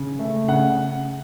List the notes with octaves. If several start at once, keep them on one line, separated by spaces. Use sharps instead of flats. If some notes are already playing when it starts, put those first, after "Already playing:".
Already playing: C#3
A3
C#3 F#5